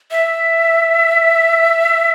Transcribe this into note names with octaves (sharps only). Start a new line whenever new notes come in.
E5